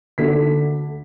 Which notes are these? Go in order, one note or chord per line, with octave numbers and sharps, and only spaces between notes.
D2 D3 A3 D4 B6